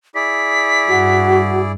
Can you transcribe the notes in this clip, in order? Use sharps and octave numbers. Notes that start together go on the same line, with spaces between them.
E4 G#4 D5 B6
G2 F#4